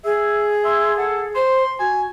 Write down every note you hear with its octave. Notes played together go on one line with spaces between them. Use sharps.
G#4 E5
E5 C6
A4 F#5
C5 C6
F#4 G#5